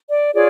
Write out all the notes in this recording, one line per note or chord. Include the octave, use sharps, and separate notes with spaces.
D5
F4 G#4 C#5 D5